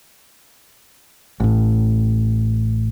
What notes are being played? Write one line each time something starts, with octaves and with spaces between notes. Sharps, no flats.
A1 A2